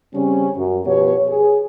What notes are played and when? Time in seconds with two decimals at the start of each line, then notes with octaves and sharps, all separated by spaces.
0.14 C#3 G3 C4 C#4
0.56 F#2
0.85 B2 F3 B3 G4 C#5
1.27 G#4